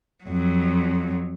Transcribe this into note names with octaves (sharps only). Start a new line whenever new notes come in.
F2 F#3